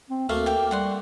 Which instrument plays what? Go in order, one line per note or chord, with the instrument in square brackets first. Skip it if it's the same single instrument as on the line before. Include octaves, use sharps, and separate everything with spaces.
[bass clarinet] C4
[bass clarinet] D2 [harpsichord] A3 A#3 [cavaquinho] F5
[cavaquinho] G4 F5
[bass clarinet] G3 [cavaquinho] F#4 F#5 C6